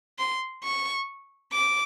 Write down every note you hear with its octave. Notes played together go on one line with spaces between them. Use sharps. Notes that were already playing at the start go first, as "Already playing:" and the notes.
C6
C#6
D6